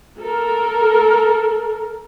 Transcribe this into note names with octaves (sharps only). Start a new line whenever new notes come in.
A4 A#4